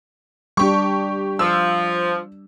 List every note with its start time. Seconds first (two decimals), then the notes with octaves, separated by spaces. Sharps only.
0.57 G3 D4 G4 C#6
1.39 F3 E6